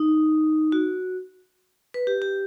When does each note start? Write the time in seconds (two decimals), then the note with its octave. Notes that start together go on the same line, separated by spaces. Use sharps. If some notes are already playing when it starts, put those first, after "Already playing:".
Already playing: D#4
0.72 F#4
1.94 B4
2.07 G4
2.22 G4